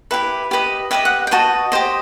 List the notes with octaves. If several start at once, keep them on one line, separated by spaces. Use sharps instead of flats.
E4 G4 B4 E5
G4 B4 D#5
G4 B4 D#5 E5
F#5
G5
F#4 B4 D#5 A5
G4 C5 D#5